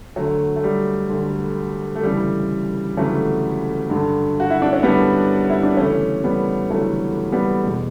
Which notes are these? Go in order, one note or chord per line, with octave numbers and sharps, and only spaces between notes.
D2 D3 F#3 A3
A3
G3
D2 D3
A3
D2 C#3 E3 G3
D2 C#3 E3 F#3 A3
G2 D3
F#4
E4
D4
C#4
G2 D3 G3 B3
E4
D4
D2 C#3 E3 A3 C#4
G3 B3
D2 C#3 E3 F#3 A3
G3 B3
E2 B2